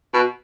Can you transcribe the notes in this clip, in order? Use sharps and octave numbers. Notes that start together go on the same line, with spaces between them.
B2